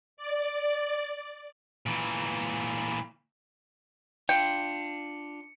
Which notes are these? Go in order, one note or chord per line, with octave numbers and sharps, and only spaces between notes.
D5
A#2 E3
D4 F4 G5 C#7